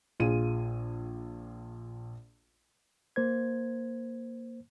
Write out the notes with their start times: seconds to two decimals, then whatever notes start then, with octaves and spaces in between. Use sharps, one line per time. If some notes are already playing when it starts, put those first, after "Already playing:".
0.20 A#1 F4 G#4 D#7
3.16 A#3 C5 G#6